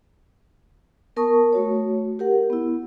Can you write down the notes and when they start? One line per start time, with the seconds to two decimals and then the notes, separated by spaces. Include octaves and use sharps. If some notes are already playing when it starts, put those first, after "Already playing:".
1.16 B3 A#4 A5 C#6 D#6
1.53 A3 F#4 C#5
2.19 G4 A#4 F#5
2.50 B3 E4